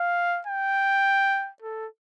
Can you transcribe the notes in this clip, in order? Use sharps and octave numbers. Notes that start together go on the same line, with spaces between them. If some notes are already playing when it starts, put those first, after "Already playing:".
Already playing: F5
G5
A4